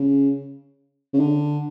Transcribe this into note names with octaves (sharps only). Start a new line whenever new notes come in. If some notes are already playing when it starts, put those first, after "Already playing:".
Already playing: C#3
C#3
D3